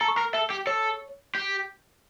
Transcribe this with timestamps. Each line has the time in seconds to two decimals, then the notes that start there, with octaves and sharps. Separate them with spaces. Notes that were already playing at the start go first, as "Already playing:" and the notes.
0.01 A4 A#5
0.08 C#6
0.16 A#4 A#5
0.33 A4 E5
0.50 G4
0.67 A4 C#5
1.35 G4